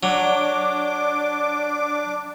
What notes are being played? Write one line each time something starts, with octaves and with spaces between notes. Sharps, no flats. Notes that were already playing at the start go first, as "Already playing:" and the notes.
F#3 D4 D6